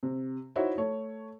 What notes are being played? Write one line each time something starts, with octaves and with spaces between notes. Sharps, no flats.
C3
D#4 E4 F#4 C5 C#5 E5
A3 C#5